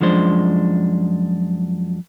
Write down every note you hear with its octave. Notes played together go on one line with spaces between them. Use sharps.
F#2 F3 G#3 D4 C5